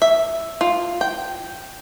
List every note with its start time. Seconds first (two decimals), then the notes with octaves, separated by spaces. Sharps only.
0.02 E5
0.61 F4
1.01 G5